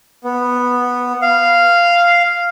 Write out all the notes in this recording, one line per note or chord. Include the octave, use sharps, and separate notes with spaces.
B3
F5